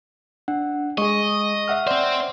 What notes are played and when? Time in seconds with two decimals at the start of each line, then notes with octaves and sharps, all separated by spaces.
0.48 D4 F#5
0.98 G#3 G#4 D#5 C#6
1.68 E5 F#5 F6
1.87 C4 C5 D5